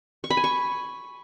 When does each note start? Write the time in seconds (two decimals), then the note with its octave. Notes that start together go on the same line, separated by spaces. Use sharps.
0.24 C#6
0.30 B5
0.37 G#5
0.44 C#6